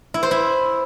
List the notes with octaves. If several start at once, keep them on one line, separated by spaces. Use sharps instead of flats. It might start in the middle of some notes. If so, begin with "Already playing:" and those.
E4
C5
E4